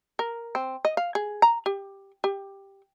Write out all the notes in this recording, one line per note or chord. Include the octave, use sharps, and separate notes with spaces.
A#4
C4
D#5
F5
G#4
A#5
G4
G4